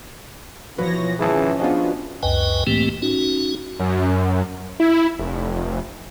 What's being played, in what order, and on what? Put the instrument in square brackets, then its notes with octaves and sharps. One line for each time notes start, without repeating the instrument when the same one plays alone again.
[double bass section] B2 F3 [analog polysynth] E3 C#5 A#6 [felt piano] F#4 B4
[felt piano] G#1 F4 A5 [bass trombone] E3 [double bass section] C#4 [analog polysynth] G#4
[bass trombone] F3 [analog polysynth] B3 D4 F#4 [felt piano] F4 G#4 D#5
[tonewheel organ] C#2 F#2 B4 D#5 G5 G#5
A2 E3 A3 A#3 C4 G4
C#4 D#4 F#4
[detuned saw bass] F#2
E4
F1